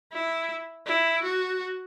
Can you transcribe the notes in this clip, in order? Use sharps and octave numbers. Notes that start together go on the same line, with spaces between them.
E4
E4
F#4